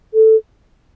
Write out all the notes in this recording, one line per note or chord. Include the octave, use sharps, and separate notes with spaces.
A4